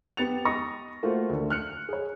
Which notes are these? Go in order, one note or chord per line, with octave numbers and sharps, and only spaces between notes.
B3 G4 A6 C#7 F7
D#5 C#6 D#6 A#6
A3 A#3 F4 F#4 C5
D2 D3
F6 F#6 C#7
G#4 C#5